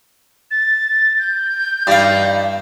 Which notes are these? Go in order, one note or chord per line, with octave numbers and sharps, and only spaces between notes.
A6
G6
G2 D#4 E4 D5 F5